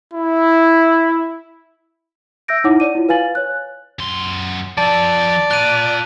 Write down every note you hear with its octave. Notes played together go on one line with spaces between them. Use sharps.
E4
E5 E6 G6 A#6 D7
D#4 E4 C#5 F#5 D6
C#5 D5 D#7
E4 F4
B4 F5 G#5 A6 F#7
C#5 F#6
F#2 C6
F3 A4 D5 A5
F4 A#5 F#6 D#7